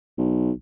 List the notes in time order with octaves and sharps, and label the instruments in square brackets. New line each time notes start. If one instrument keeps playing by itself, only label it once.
[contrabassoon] B1